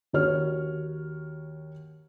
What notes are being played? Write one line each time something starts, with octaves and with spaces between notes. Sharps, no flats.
D#2 F#4 C#5 F6